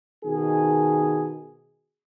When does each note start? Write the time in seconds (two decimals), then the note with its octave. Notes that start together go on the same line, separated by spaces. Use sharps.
0.24 B2 D#3 G#4